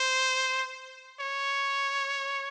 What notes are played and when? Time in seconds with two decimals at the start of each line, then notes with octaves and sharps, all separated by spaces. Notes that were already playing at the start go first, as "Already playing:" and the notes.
Already playing: C5
1.20 C#5